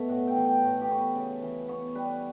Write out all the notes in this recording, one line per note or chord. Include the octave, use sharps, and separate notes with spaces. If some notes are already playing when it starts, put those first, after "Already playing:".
Already playing: B2 A3 E5
A2 F#5
G5
E3
G5
A2
G4
B3 C#5
B4
C#3
E3
B3 C#5
G3 B4